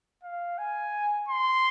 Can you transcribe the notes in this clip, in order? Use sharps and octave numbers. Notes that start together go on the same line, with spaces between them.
F5
G#5
C6